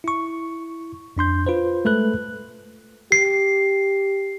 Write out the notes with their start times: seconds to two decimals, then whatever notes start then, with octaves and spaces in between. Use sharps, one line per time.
0.04 E4 C#6
1.17 F2 D4 C6 G6
1.47 F4 B4 C5
1.85 G#3 A3 A4 B4 F#6
3.12 G4 C7